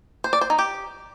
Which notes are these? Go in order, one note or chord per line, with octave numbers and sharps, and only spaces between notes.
C5
D5
C5
D#4
G4